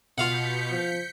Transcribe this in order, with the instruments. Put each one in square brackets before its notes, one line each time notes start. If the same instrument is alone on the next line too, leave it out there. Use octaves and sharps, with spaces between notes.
[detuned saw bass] B2 [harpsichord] F4 F5 F#5 [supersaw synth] G6 B6 C#7
[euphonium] F3